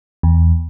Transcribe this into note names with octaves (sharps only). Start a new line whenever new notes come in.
E2